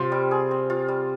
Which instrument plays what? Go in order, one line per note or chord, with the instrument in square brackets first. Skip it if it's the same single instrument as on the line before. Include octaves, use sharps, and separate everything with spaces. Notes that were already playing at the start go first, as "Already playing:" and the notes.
Already playing: [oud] C3 [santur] F4
[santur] G3
G#4
C4
F4
G3